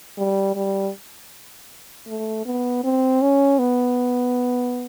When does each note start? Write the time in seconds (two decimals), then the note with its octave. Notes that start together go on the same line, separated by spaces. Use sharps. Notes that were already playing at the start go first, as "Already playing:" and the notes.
0.18 G3
0.55 G3
2.07 A3
2.46 B3
2.84 C4
3.21 C#4
3.59 B3